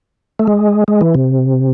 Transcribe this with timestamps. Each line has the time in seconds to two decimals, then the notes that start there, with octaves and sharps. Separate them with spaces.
0.39 A3
0.47 G#3
0.88 G#3
1.01 E3
1.15 C3